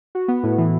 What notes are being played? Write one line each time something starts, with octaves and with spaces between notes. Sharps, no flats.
F#4
B3
A2
E3